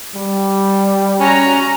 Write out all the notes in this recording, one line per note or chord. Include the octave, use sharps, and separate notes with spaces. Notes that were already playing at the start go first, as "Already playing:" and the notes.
G3
C#4 F#4 A#5